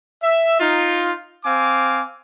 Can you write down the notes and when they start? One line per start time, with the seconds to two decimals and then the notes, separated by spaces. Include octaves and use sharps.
0.23 E5
0.60 D#4 F4
1.44 C4 F5 G#5 D6